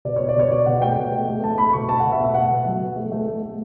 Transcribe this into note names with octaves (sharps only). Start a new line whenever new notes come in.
B2 D5
B2 C#5
D5
B2 C#5
B2 D5
B2 F#5
A3 G5
B2
A3
A3
A3 A5
A3 B5
B2 C#6
A3 A5
B2 F#5
E5
B2
E5
A3 F#5
B2
F#3
B2
A3
A3
A3
A3